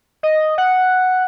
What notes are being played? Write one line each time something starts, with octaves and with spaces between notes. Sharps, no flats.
D#5
F#5